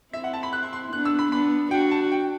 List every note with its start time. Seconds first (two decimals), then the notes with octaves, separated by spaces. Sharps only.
0.13 C4 E4 E5
0.24 F#5
0.33 A5
0.43 B5
0.53 F#6
0.63 C6
0.73 C6
0.92 B3 D4 F#6
1.05 E6
1.19 B5
1.32 B3 D4 B5
1.71 D4 F#4 G5
1.91 A5
2.12 G5